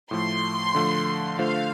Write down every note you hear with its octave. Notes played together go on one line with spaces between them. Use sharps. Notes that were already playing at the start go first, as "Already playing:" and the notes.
A2 F3 A3 C6
D3 F3 A3
D3 A3 F4 C5 F5